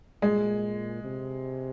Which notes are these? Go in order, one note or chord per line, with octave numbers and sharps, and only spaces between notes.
A#2 G#3
C3